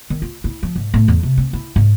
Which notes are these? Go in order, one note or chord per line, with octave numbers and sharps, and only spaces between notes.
D#3
F4
E4
F3
G#2
A2
E2
C3
C4
E4
G#2